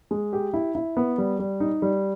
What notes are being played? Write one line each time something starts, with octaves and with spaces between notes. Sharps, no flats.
G#3
G4
E4
E4
B3
G3
G3
D#4
G3